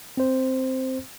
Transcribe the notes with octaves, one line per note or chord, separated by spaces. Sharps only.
C4 C5